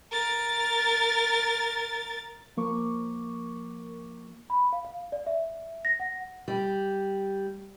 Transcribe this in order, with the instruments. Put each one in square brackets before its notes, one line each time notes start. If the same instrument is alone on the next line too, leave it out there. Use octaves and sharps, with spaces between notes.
[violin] A#4 A6
[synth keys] F3 A#3 A#4 C#6 D6
[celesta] B5
F5
F5
D5
E5
A#6
F#5
[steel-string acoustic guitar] G3